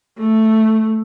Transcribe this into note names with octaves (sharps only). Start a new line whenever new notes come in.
A3